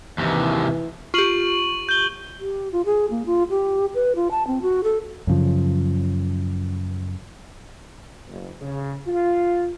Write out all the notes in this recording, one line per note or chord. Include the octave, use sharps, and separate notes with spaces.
D#2 C3 E3
F4 G4 C#6 D#7 F#7
G6 G7
G4
F4
G#4
A#3
F4
G4
B4
F4
A5
C4
F#4
A4
F#2 C#3 F3
F#1
C#3
F4